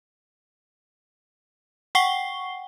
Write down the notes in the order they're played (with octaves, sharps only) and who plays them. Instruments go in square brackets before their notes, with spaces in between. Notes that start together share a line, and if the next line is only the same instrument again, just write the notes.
[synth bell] F#5 G5 C#6 C7 G7